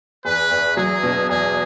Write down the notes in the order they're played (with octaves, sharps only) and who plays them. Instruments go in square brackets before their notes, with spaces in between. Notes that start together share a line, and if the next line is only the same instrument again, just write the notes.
[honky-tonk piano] E2 [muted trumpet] B4
[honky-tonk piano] E2
[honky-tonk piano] F#3 [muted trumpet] G#4
[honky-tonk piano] B2
[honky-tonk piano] E2 [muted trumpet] G#4